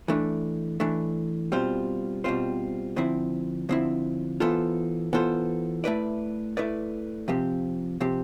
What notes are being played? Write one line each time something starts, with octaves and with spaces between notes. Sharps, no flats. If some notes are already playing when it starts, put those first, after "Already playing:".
E3 A3 D4
E3 A3 D4
B2 G3 C4 F4 C5
B2 G3 C4 F4 C5
D3 F3 C4 E4
D3 F3 C4 E4
E3 B3 F4 A4 C5
E3 B3 F4 A4 C5
A3 E4 B4 D5
A3 E4 B4 D5
C3 F3 C4 G4
C3 F3 C4 G4